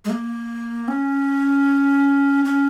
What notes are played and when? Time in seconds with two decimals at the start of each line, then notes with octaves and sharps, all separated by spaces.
0.05 G#3
0.10 A#3
0.88 C#4
2.45 C#4